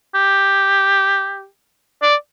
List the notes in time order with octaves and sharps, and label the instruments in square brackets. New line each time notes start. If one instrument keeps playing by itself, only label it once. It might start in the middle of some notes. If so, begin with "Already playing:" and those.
[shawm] G4
D5